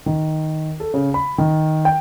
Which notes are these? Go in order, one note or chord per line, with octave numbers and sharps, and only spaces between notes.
D#3
A4
C#3
B5
D#3
G5